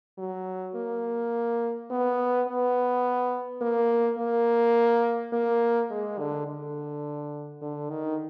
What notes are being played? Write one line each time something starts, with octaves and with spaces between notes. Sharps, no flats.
F#3
A#3
B3
B3
A#3
A#3
A#3
G#3
D3
D3
D3
D#3